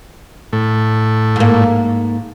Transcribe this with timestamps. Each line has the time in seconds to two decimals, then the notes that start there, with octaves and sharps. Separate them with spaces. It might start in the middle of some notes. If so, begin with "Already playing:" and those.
0.53 A2
1.36 G#2 A#3